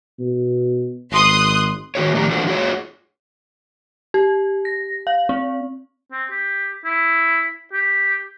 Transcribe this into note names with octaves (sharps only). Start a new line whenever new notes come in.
B2
G#1 C6 D#6 F#6
D#3 F#4 G#4 C#5
A2 D#3 F3 D4 G4 A#5
E3 D4 F4 F#4 A4 C5
F4 F#4 G#4 C#5
G4
A#6
F5
C4
C4
G4
E4
G4